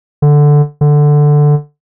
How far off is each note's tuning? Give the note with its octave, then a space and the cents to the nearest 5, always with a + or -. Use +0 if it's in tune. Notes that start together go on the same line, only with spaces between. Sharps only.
D3 +0
D3 +5